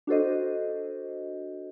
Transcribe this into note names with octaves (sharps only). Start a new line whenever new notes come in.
D4 F#4 A4 C5 D#5